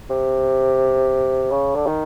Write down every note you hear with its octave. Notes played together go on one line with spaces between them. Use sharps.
C3
C#3
D3
D#3